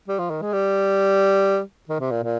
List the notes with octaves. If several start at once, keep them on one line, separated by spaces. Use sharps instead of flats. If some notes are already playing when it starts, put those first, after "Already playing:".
G3
F3
D#3
G#3
G3
D#3
C3
A#2
A#2